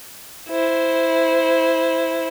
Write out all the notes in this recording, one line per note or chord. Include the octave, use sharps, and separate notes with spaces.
E4 C5